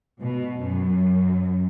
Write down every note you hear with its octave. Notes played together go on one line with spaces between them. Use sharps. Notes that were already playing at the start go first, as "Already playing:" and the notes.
B2
F#2